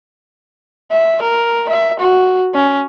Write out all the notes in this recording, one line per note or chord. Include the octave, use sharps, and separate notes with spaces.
E5
A#4
E5
F#4
C#4